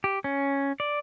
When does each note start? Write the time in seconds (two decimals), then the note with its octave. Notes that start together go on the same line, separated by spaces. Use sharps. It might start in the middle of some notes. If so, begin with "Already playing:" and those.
0.04 G4
0.24 C#4
0.80 D5